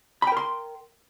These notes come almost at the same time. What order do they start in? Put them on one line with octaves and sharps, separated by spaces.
B5 G5 A#4 C6